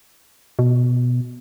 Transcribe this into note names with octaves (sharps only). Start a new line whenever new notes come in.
B2